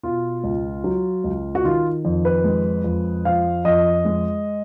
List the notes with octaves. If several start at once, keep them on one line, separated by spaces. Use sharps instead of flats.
B2 F4
C#2
F#3
C#2
F#4
D#3 F4
F2
B4
G#3
F2
F3 F5
F2 D#5
G#3